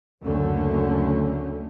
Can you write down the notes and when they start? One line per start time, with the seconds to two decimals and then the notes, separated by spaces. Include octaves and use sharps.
0.23 F#1 D2 D3 A3 C#4